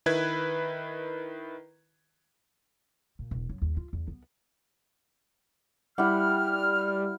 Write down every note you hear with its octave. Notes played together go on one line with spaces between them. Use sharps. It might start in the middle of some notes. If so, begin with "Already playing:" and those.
D#3 E4 B4 G#6
A#2
E1
F#2
D#2
F4
E2
B3
G3 E4 F#5 F6